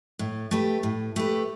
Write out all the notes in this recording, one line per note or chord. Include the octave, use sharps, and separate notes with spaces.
A2
A3 G4 B4
A2
A3 G4 B4